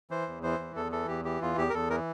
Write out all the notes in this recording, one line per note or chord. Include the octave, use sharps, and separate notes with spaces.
E3 C5
E2
E3 C5
E2
E2 A4
E3 A4
E2 G4
E3 G4
E2 F4
E2 G4
A#4
E2 A4
E3 A#4